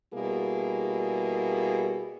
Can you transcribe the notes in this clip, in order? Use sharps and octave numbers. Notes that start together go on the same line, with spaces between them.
B2 G3 A#3 E4 G#4